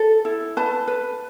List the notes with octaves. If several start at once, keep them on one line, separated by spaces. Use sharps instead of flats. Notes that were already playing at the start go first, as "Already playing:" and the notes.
Already playing: A4
E4
B4 A5
B4